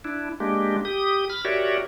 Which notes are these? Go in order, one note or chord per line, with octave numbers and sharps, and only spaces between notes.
D4 E4
G#3 A#3 D4 G4
G4 D#6
B5 F6
F#4 G4 A#4 C#5 D5 E5